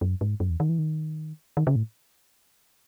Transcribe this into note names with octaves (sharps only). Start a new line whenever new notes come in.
F#2
G#2
F#2
E2
D#3
E3
D#3
D#3
C#3
A2